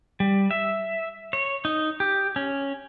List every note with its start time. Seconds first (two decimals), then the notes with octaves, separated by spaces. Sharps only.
0.20 G3
0.51 E5
1.33 C#5
1.65 D#4
2.00 G4
2.36 C#4